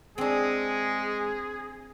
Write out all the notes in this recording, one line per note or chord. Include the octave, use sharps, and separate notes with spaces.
G#3 C4 D4 G#4